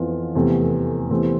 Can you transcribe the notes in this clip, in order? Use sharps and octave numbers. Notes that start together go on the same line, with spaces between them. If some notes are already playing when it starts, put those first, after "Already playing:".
Already playing: F2 E3 B3 F4
F1 E2 C3 E3 A3
E2 C3 E3 A3 C4